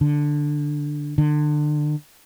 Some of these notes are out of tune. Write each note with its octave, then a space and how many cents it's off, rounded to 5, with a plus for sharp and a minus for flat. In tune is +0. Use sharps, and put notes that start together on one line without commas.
D3 +5
D3 +30